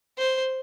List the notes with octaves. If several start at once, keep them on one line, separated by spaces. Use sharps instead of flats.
C5